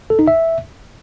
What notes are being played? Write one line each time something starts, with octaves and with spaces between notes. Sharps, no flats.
A4
D#4
E5